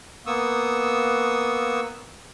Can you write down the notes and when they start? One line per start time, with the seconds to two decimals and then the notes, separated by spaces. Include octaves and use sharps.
0.26 A#3 B3 C#6 D#6 E6